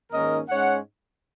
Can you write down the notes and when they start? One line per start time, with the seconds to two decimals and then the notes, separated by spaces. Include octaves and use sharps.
0.10 G#2 D#3 A#3 C#4 A#4 D#5
0.48 G#2 G#3 C#4 C#5 F#5